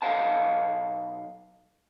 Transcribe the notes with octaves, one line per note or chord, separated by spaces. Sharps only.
B1 F#3 D#5 F5 F#5 A5